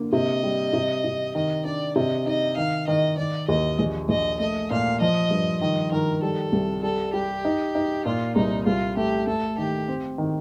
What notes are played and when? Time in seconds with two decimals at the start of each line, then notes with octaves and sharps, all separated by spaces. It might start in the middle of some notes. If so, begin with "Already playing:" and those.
Already playing: D3 A#3
0.13 C3 D#5
0.43 G3
0.73 C3
1.04 C3
1.35 D#3 D#5
1.65 D4 D5
1.96 C3 D#5
2.26 D#4 D#5
2.57 D#3 F5
2.87 D#3 D#5
3.17 D#3 D5
3.48 D#2 D#5
3.79 A#1
4.09 A#1 D#5
4.40 A3 D#5
4.71 A#2 F5
5.01 F3 D#5
5.31 G2
5.61 D#3 D#5
5.92 D#3 A#4
6.22 G3 A4
6.52 C2
6.83 G3 A4
7.13 G3 G4
7.45 D#4
7.75 D#4
8.05 A#2 F4
8.35 C2 D#4
8.66 C2 F4
8.97 A3 G4
9.27 A3 A4
9.58 D#3 G4
9.88 C4
10.18 D#3